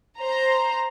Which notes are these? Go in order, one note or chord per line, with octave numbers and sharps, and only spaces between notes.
C5 A#5